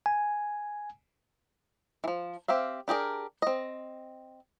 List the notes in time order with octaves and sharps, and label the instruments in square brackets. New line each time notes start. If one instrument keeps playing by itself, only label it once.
[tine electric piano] G#5
[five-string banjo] E3 F3
C4 G4 E5 F5
D4 G4 G#4 A#4
C4 D#5